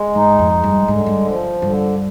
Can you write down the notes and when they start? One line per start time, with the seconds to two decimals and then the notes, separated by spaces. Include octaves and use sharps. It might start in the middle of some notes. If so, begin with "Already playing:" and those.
Already playing: G#3
0.14 G#2 D#4
0.39 F2
0.52 G#3
0.64 G2
0.88 G#2 D3
1.06 G2
1.25 F3
1.62 G2 D3